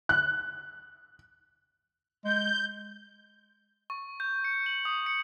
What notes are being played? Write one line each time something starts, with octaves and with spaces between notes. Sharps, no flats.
F#6
G#3 G6
C#6
G6
C#7
F#7
D#6
C#7